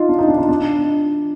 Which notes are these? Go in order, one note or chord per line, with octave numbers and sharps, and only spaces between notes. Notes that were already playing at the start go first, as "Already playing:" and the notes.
Already playing: D#4 F4
D4
D#4
D4
D#4
D4